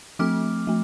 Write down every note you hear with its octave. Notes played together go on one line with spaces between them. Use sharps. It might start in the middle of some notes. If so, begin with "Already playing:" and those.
F3 A3 C4 D6 F6
F3 A3